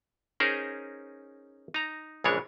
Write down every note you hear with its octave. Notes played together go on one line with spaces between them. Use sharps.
C#4 D#4 G#4 A#4 C5
D#4 A#5
A#1 C#3 E3 G#3 D4 C#5